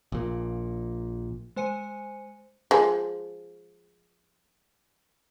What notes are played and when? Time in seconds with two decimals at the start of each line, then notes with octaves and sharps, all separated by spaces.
0.12 A#1 A#2
1.56 G#3 C5 G#5 C#7 D#7
2.71 F3 G#3